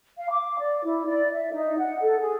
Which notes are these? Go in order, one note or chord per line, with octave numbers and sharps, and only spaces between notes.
F5
D6
D5
E4
D5
E5
D#4
F#5
A4
G#4